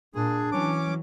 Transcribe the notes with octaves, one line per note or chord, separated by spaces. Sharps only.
A#2 D4 G#4
E3 F#3 C#4 D6